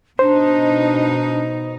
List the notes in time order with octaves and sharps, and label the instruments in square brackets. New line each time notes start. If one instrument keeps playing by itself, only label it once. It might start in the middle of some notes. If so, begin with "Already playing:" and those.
[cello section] B2 D#4 [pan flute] D4 [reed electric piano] C5